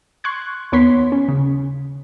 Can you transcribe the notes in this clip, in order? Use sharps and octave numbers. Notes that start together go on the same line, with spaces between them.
C6 C#6 F#6 G#6
D#2 B3 C#5 C6 B6
C#4
C#3